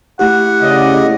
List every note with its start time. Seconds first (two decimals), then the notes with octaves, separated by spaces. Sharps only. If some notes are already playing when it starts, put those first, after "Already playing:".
0.19 A3 E4 G4 F#5
0.62 C#3 D5 D#5